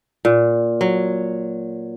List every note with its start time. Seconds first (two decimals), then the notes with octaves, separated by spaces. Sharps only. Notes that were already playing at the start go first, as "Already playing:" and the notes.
0.25 A#2
0.81 F#3